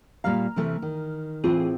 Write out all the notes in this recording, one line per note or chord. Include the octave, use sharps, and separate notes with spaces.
A#2 G3 F5 A#5 F6
C3 E3 A3
D#3
A2 E3 C4 F4 G#4